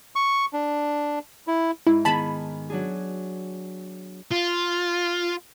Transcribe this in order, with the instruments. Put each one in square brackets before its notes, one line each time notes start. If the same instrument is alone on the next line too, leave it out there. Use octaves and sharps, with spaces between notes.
[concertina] C#6
D4
E4
[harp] G#2 [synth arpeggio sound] E4
[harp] D#3 B3 G#4 [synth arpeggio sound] A5 B5
[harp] F#3 D4 G#4
[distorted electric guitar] F4